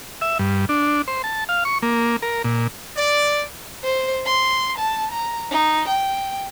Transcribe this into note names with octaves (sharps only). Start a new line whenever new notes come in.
E5
G2
D4
C5
A5
F5
C#6
A#3
A#4
A#2
D5
C5
C6
A5
A#5
D#4
G5